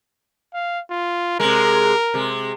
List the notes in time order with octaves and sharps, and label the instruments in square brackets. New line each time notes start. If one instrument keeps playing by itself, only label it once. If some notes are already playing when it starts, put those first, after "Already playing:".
[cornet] F5
F4
[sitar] C3 G#3 [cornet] A#4
[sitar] C3 G#3